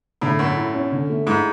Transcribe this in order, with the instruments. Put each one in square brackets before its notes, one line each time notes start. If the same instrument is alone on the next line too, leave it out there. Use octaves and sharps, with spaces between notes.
[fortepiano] A2 [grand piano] D3
[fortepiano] F#2 [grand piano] A3
[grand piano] E4
C#4
D3
A3
[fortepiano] G#2 [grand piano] E4